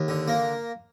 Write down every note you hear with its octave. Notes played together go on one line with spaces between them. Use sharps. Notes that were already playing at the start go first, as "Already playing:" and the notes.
Already playing: D#2
D3
A#3